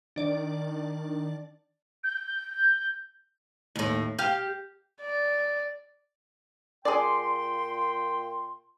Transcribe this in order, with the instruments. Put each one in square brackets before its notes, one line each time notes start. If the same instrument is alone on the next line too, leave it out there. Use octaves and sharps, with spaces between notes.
[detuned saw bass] D#3 [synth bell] D4 D5
[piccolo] G6
[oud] D#2 A2
G4 F5
[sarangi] D5
[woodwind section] A#2 G5 C6 [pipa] G#4 D5